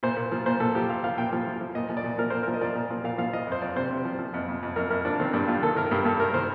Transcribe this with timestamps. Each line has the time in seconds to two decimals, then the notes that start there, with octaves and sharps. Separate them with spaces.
0.03 A#2 C5
0.17 A#2
0.32 F3
0.46 A#2 C5
0.60 A#2 A4
0.75 F3 G4
0.89 F3 F5
1.04 F3 F5
1.18 A#2 G5
1.33 F3
1.46 F3
1.60 F3
1.75 A#2 D#5
1.89 F3
1.97 D5
2.04 A#2
2.18 F3 A#4
2.30 A#2 C5
2.43 F3 A#4
2.54 D#5
2.61 F3 D5
2.75 A#2
2.90 F3
3.04 A#2 F5
3.18 F3 F5
3.33 F3 D#5
3.47 F2 C5
3.62 F2 D5
3.76 C3 C5
3.91 C3
4.05 F3
4.19 F3
4.34 F2
4.48 F2
4.63 F2
4.76 F2 A#4
4.90 F2 A#4
5.05 F3 D4
5.19 D#3 C4
5.33 G2 D4
5.48 G2 F4
5.62 D#3 A4
5.76 D#3 A#4
5.91 G2 G4
6.05 G2 A4
6.20 G2 A#4
6.34 D#3 C5